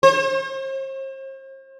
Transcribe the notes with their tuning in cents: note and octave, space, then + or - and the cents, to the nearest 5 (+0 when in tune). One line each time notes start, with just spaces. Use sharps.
C5 +40